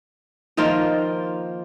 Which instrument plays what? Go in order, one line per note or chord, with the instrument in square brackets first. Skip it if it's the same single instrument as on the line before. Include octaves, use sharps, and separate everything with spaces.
[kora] D#3 F3 A#3 F4